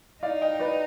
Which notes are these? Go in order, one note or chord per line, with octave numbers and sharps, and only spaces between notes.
D#4 D5 F5
D#5 G5
B4 D5